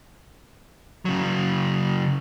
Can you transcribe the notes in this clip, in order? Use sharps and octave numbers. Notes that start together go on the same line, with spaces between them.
C#3 F#3